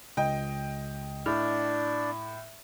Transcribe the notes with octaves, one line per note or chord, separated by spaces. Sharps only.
C#2 D#5 G5
A2 D4 D5 F6